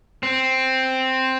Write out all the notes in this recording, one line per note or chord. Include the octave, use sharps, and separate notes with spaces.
C4